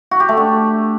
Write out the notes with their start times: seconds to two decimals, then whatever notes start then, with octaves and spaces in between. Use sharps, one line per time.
0.11 F#4
0.20 G4
0.29 A3
0.37 D4